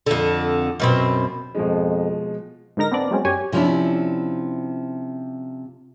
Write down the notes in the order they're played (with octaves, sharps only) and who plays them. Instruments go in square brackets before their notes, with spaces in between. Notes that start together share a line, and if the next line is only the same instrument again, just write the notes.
[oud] F2 D3
F#2 B2 C4
[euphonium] F2 [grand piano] B2 F3 G#3
[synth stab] G#2 D3 D#4 A#4 A#6
B3 C4 D4 D5
F#3 G#3 C4 C#4
F#2 G4 C#5 G#5
[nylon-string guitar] C3 F3 C#4 D4 E4